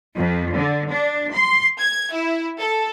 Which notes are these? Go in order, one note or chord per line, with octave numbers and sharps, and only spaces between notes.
F2
D3
D4
C6
G#6
E4
A4